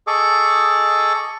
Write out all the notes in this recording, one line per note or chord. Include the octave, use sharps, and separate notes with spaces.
G#4 A4 D#5 C#6 D6